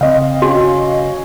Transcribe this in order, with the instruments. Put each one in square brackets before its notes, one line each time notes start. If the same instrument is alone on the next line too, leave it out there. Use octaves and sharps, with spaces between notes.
[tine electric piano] C#3 [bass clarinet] C4 [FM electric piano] D#5 F5
[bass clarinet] C#4 [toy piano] F#4